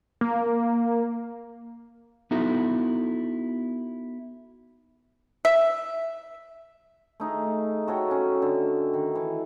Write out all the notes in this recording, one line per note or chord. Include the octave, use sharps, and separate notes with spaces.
A#3
B3 D#4 E4 F#4 A4
E5
A3 D#4 G#4
F#4 A4 C#5 G5
C#4
D3
D#3
E3